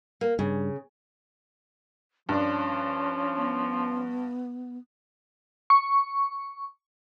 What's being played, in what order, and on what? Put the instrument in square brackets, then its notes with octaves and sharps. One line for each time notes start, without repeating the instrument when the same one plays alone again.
[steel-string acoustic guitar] A#3
[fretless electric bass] G2 [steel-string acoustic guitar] C#3
[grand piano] G2 D4 [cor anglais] F3 [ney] C#4
[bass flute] B3
[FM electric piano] C#6